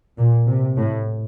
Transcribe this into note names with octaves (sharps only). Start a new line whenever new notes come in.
A#2
C3
A2